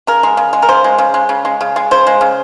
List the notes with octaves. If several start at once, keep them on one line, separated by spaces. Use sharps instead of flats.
C#3 A#4
G#3
C#3
G#3
A#4
C#3 C5
G#3
C#3
G#3
C#3
G#3
C#3
G#3
C#3 C5
G#3
C#3